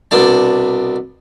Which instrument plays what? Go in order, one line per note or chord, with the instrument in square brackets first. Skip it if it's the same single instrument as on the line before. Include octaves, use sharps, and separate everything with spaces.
[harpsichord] C2 B2 D4 A5